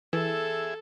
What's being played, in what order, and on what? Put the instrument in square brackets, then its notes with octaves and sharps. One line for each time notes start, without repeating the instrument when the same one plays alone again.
[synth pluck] E3 [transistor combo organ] G#4 E5 [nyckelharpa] A4